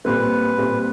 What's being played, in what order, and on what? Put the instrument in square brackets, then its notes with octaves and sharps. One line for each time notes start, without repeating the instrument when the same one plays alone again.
[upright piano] A#2 G3 C4 [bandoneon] B4
[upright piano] A#2 G3 C4